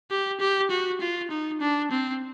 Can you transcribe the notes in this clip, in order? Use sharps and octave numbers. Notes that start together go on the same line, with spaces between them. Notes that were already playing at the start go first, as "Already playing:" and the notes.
G4
G4
F#4
F4
D#4
D4
C4